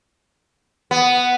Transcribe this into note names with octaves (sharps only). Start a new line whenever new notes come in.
B3